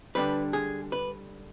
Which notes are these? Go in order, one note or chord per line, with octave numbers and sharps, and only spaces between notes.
D3 G3 D4 B4
G#4
B4